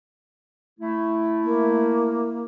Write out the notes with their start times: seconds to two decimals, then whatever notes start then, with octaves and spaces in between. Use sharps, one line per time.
0.79 A3 E4
1.44 A#3